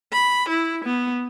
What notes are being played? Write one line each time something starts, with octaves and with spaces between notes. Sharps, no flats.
B5
E4
B3